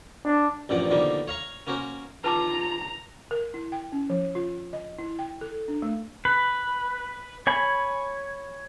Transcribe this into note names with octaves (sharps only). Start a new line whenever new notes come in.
D4
A1 G2 A#2 F3 F#5 D6
B2 D3 D#3 F3 G3 A#3
C#5 F5 A#5 C#6
A#3 C#4 F#4 A#4 C5
F4 B4 A5 A#5 D6
A#4
E4
G5
C#4
F3
F4
D#5
E4
G5
A4
D4
A3
B4
C#5 G#5 B5